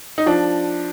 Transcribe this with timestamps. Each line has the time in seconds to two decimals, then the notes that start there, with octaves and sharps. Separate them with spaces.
0.18 D#4
0.26 F3 D4